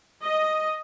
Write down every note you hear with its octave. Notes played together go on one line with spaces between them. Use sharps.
D#5